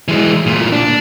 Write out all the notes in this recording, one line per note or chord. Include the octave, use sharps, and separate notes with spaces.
E3 G#3
D2 A#2
D4